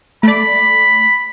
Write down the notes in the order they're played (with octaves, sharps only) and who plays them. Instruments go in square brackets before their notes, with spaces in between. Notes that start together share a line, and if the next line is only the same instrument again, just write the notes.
[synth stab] A3 D5 [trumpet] B5